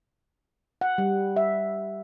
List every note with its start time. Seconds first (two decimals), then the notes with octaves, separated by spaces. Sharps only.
0.81 F#5
0.98 G3
1.36 E5